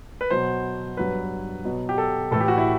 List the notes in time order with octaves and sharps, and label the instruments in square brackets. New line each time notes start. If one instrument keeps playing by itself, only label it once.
[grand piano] B4
B2 F#3 B3 C5
G2 F#3 B3 B4
B2 F#3 B3
G4
A4
A2 E3 A3 A4
G4
F#4
E4